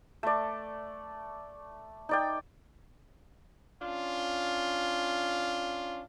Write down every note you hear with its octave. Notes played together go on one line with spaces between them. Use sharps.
A3 D5
D#4 D5 G5
C#4 D4 F4